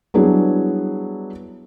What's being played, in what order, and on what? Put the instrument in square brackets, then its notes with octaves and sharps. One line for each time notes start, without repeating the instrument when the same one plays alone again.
[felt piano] F#3 G3 B3 D4 E4 G#4